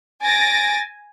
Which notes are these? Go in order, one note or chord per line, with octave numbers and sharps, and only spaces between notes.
G#5 A6 A#6 D7